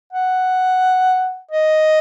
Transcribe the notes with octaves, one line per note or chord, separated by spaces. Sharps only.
F#5
D#5